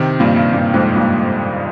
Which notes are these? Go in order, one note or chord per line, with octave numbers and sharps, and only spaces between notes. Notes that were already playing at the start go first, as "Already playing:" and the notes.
Already playing: C3 D#3
G2 A#2
G2
G2 A#2
F2 G#2
G2 A#2